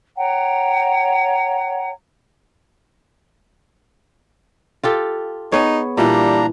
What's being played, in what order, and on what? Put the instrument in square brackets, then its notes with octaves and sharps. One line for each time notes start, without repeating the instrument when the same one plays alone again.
[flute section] C#5 F#5 G5 A#5
[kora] F4 G4 A4
[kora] B3 G#4 C#5 [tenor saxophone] D#4
[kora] A#2 E3 [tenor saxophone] G3 [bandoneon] A#3 D4 A#5